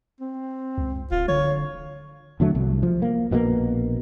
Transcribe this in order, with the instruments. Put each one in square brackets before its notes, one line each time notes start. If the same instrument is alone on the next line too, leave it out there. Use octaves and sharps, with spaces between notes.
[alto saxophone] C4
[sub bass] C#2
[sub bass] D1 [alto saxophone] F4
[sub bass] D3 [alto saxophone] C#5
[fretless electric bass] E2 D3 F#3 A3
C2
F3
A#3
A#1 B2 D#3 A#3